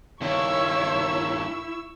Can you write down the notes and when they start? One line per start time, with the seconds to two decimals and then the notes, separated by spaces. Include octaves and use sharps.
0.22 G2 D#3 E4 C#5 C#6 E6